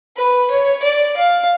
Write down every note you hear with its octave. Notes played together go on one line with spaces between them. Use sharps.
B4
C#5
D5
F5